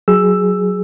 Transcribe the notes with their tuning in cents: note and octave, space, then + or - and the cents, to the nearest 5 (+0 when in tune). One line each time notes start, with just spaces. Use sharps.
F#3 +0 G#4 +0 E6 +5